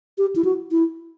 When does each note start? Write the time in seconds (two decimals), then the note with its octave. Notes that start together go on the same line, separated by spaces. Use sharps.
0.18 G4
0.36 E4
0.45 F#4
0.71 E4